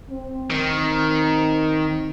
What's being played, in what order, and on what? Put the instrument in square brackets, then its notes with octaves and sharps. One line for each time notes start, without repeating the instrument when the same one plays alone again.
[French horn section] C4
[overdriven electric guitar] D#3